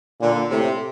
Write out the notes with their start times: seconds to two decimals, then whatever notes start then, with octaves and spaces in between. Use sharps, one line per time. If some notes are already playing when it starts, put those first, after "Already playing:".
0.21 A#2 D3
0.50 A2 C3